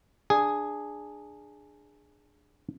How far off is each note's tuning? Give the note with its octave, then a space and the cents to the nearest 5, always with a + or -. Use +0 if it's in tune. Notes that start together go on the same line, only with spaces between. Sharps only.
D4 +15 G#4 +0